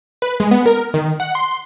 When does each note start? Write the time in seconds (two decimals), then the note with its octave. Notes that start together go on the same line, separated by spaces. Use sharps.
0.22 B4
0.40 G#3
0.51 B3
0.66 A#4
0.94 D#3
1.20 F#5
1.35 C6